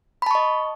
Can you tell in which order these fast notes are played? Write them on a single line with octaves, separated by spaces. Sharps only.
B5 A5 C#6 D#5